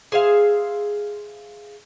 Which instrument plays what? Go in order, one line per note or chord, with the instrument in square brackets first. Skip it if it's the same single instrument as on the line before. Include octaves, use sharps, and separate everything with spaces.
[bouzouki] G#4 C5 E5 F5